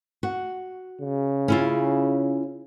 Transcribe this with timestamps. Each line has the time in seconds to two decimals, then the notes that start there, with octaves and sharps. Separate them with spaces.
0.23 F#4
1.01 C#3
1.48 C#4 E4 F4